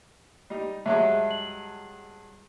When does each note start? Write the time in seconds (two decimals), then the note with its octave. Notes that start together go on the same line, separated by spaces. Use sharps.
0.50 G3 D#4
0.86 G2 F#3 G#3 E5
1.31 F#7